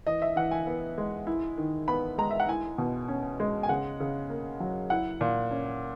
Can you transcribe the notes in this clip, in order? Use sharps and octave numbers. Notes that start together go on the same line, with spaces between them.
E3 D#5
E5
E3 F#5
G#5
B3
G#3
E4
D#3
B3 B5
G#3 A#5
E5
F#5
E4 G#5
B2
C#4
G#3
G#5
C#3 F#5
C#3
A#3
F#3
E4 F#5
A#2
C#4